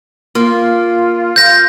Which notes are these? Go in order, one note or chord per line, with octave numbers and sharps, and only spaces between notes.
A#3 F4
G6 A#6